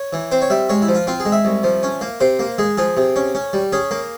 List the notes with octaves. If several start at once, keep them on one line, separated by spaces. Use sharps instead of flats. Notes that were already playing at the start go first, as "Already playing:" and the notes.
Already playing: C#5
E3
C4 C5
C#5
G3 E5
G#3 C#5
E4
F3
F4
C4 F4
G#4
G#3
E5
C2
F3
C#4
A#3
C3 C5
A#3
G#3 G#4
F3 G#4
C3
C#4
C#4
G3
C#4 G#4
A#3